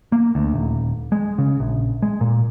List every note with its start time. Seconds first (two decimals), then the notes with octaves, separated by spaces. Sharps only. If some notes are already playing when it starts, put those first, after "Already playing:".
0.12 A#3
0.35 D2
0.54 D#1
1.12 G#3
1.38 C#3
1.60 A#1
2.02 G#3
2.21 A#2